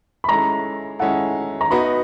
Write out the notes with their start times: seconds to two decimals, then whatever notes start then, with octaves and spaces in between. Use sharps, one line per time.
0.24 B5
0.29 G#3 C#4 E4 A4 A#5
0.99 G#3 C#4 E4 A4 F#5
1.61 A#5
1.71 B3 D#4 F#4 B5